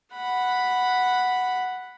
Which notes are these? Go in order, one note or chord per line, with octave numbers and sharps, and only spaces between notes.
F#5 B5